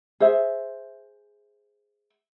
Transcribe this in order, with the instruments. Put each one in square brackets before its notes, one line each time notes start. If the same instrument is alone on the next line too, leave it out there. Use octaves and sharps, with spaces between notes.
[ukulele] G#4 C5 E5